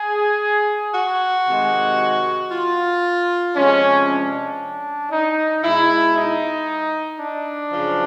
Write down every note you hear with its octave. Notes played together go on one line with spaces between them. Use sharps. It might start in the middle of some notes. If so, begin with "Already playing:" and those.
Already playing: G#4
F#4
C3 D#3 G#3
F4
C3 F3 G#3 C#4
D4
D#4
B2 G#3 E4
D#4
D4
F#2 C#3 F3